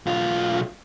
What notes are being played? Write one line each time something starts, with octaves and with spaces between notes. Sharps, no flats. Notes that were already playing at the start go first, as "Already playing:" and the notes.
B1 F4